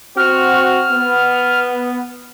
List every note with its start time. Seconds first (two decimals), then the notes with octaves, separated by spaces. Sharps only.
0.17 C4 F#4 F6
0.91 B3